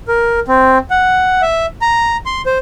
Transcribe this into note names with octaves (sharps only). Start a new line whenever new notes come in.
A#4
C4
F#5
E5
A#5
C6
C5